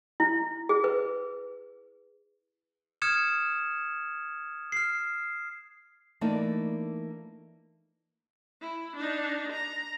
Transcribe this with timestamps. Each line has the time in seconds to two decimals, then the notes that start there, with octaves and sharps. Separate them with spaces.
0.20 E4
0.69 G#4
0.84 B4
3.02 D#6 F6 G#6 C#7 E7
4.72 F6 C7
6.21 E3 A3 A#3 D4 D#4 D5
8.61 E4
8.96 D4 D#4
9.52 A#5